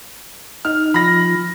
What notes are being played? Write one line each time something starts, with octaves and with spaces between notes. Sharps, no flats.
D#4 F6
F3 B5 A#6